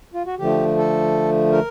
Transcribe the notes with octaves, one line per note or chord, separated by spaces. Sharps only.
F4
F#4
D3 F3 A3 G4
A4
A#4